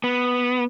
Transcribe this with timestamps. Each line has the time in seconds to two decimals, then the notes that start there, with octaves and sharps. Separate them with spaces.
0.04 B3